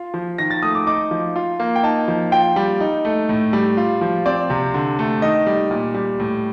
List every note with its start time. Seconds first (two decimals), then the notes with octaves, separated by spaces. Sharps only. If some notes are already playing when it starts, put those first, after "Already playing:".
Already playing: F4
0.14 F3
0.38 D#3 A#6
0.50 A6
0.63 A3 D#6
0.75 D6
0.87 D#4 D6
1.11 F3
1.36 F4
1.60 A#3
1.76 G5
1.83 D#4 A5
2.08 F3
2.32 F4 G5
2.56 G3
2.81 D#4
3.05 A3
3.29 A2
3.53 G3
3.77 F4
4.01 F3
4.26 C4 D5
4.50 C3
4.74 D3
4.99 A3
5.22 D#3 D#5
5.47 G3
5.71 A#2
5.94 G3
6.20 A2